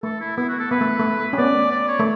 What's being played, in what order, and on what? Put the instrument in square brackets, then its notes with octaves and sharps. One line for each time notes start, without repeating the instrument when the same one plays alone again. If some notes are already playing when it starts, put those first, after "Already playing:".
[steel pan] A3 [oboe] A4
[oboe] E4
[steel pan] B3 [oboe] E4
[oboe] F#4
A4
[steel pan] B3 [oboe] B4
[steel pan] A3
A3
C#4
[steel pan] B3 [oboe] D5
[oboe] D5
C#5
[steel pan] A3